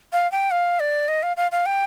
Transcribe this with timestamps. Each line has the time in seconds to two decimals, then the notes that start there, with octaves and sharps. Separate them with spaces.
0.12 F5
0.32 G5
0.51 F5
0.80 D5
1.08 D#5
1.23 F5
1.37 F5
1.52 F5
1.66 G5